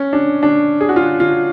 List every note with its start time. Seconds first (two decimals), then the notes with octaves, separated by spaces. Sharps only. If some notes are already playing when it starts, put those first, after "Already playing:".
Already playing: C#4
0.13 D4
0.43 D4
0.81 G#4
0.89 F#4
0.96 F4
1.20 F4